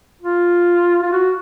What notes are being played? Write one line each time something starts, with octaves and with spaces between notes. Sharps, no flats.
F4
F4
F#4